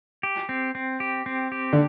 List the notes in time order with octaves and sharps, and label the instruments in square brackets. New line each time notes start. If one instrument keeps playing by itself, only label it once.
[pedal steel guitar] G4
C4
C4
G4
C4
G4
[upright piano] D3